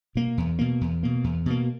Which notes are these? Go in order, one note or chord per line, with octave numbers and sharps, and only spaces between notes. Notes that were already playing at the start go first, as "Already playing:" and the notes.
B2 A#3
E2
B2 A#3
E2
B2 A#3
E2
B2 A#3